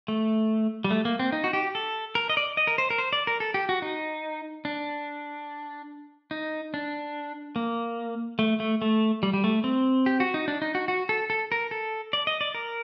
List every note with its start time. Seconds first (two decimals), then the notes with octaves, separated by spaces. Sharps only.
0.08 A3
0.84 G3
0.91 A3
1.05 A#3
1.19 C4
1.32 D#4
1.44 F#4
1.53 G4
1.75 A4
2.15 A#4
2.30 D#5
2.37 D5
2.57 D#5
2.67 A#4
2.78 C5
2.90 A#4
2.98 C5
3.13 D5
3.27 A#4
3.40 A4
3.54 G4
3.69 F#4
3.82 D#4
4.65 D4
6.31 D#4
6.74 D4
7.56 A#3
8.39 A3
8.60 A3
8.82 A3
9.23 G3
9.34 G3
9.44 A3
9.64 C4
10.06 G4
10.20 F#4
10.34 D#4
10.48 D4
10.62 D#4
10.75 F#4
10.88 F#4
11.09 A4
11.30 A4
11.52 A#4
11.71 A4
12.13 D5
12.27 D#5
12.41 D5
12.55 A#4